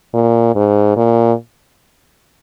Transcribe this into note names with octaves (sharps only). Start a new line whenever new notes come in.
A#2
G#2
A#2